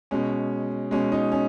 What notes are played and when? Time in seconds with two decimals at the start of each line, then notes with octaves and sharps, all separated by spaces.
0.11 B2 G#3 C#4
0.91 B2 G#3 C#4
1.12 D#4
1.32 C#4